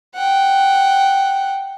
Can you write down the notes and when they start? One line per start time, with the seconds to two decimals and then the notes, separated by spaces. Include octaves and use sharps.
0.15 F#5 G5